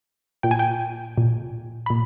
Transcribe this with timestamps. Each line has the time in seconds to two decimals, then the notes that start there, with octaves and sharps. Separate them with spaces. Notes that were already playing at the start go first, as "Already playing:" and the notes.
0.43 A#2 G5
0.51 G#5
0.59 G5
1.18 A#2
1.86 B5
1.90 A#2